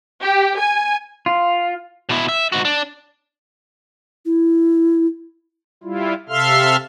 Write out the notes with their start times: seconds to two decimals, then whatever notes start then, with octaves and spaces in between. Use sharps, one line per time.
0.21 G4
0.58 G#5
1.26 F4
2.09 B2 E4
2.29 E5
2.52 G#2 F#4
2.65 D4
4.25 E4
5.83 G3 E4 F4
6.29 C3 A4 E5 F5 C6 F6